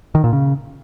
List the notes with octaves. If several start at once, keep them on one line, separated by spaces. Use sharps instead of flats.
D#3
A#2
C#3